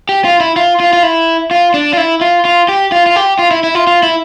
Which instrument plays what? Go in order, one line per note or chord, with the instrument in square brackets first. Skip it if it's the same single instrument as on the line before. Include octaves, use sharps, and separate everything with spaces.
[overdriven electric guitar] G4
F4
E4
F4
F4
F4
E4
F4
D4
F4
E4
F4
F4
G4
F4
F4
G4
F4
E4
E4
F4
F4
E4